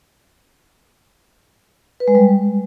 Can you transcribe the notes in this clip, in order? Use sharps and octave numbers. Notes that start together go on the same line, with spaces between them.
B4
G#3
G3